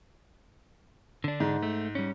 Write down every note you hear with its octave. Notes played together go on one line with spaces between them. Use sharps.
D3 D4
G#2
A3
G3 C#4